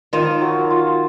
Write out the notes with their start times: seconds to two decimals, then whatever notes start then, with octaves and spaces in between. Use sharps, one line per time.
0.13 D#3 D#4 F4
0.41 F#3
0.70 F4